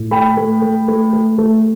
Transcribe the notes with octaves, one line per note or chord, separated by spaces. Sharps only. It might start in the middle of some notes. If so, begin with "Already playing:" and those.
Already playing: A2
A3 G5 B5
A3
A3
A3
A3
A3